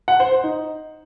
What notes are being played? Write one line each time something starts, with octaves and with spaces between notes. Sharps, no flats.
F#5
C5
C5
D#4